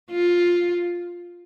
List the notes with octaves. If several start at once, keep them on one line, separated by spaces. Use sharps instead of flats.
F4